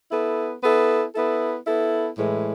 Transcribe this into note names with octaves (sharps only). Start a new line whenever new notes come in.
B3 E4 A4
B3 E4 A4
B3 E4 A4
B3 E4 A4
A2 E3 G#3